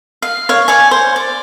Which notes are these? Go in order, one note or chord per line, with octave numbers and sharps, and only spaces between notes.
F5
C#5 F5
C#5 D5 G#5
C5
D5